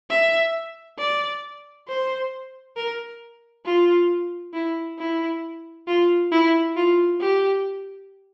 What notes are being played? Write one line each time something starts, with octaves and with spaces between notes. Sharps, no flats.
E5
D5
C5
A#4
F4
E4
E4
F4
E4
F4
G4